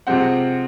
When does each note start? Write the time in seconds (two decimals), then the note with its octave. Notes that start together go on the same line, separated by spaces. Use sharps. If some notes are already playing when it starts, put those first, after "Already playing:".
0.07 C3 F3 G#3 C4 F#5